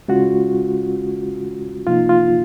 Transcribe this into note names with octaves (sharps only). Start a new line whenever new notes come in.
C#3 G#3 C#4 F4 F#4
C3 F3 A#3 D#4 F4
F4